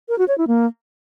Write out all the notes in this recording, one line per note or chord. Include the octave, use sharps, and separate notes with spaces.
A#4
F#4
C#5
E4
A#3